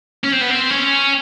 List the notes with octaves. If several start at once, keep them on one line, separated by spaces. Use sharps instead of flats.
C#4
C4
B3
C4
C#4